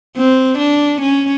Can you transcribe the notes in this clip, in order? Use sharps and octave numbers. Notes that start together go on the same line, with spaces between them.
C4
D4
C#4